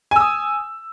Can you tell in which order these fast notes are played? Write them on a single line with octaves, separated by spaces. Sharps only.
G#5 E6 D#6